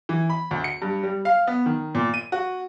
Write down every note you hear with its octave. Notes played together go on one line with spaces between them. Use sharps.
E3
B5
D2
C#7
G2
G3
F5
B3
D#3
A#2
D#7
F#4